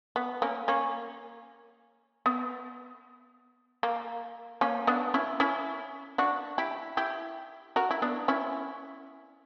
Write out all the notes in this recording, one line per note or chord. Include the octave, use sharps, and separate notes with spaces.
B3
A#3 C#4
A#3 C#4
B3
A#3
A#3 C#4
B3 D4
C#4 E4
C#4 E4
D4 F#4
E4 G4
E4 G4
F#4 A#4
E4
B3 D4
C#4 E4